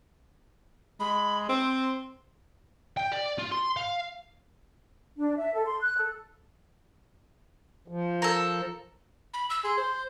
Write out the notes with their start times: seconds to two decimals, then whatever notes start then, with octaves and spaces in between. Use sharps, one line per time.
1.00 G#3 B5
1.49 C4 C6
2.97 G5
3.12 D5
3.39 F4
3.52 C6
3.77 F5
5.17 D4
5.37 E5
5.54 A4
5.66 C6
5.81 F#6
5.97 A4
7.88 F3
8.22 A4 A#4
9.34 B5
9.50 E6
9.64 G#4 C6
9.77 C5